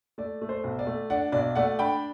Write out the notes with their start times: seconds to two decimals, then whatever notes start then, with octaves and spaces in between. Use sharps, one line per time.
0.18 A3 D5
0.41 A3
0.49 C5
0.64 B1
0.79 D5
0.87 A3
1.10 D4 D5 F#5
1.32 B1 D5
1.55 A3 D5 F#5
1.79 D4 G5 B5